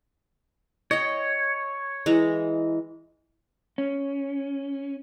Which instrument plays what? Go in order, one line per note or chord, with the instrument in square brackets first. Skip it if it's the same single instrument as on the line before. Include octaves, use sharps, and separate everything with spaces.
[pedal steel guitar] C#5 [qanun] D#5 G5
[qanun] E3 G#3 A#5
[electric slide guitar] C#4